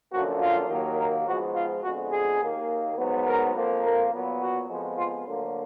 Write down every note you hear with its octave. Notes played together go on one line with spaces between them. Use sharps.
F#2 D3 F3 A#3 F#4
F4
D#2 D#3 F#3 A#3
A#4
G#2 F3 G#3 B3 F#4
F4
F2 D3 G#3 B3 F#4
G#4
D#2 D#3 A#3
G#2 F#3 B3
A#4
F2 F3 A#3
A#4
A#2 F#3 B3
F#4
F2 F3 G#3 B3
F4
D2 D3 F#3 A#3